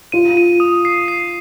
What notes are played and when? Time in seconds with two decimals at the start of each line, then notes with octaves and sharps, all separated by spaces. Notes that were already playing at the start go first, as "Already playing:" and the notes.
0.12 F4 D#7
0.37 D#7
0.60 D#6
0.85 C7
1.08 C7